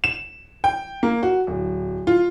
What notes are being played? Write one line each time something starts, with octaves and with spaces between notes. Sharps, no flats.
E7
G5
A#3
F#4
D1
F4